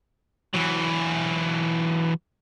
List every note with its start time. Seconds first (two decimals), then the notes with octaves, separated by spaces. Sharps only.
0.54 E3 F#3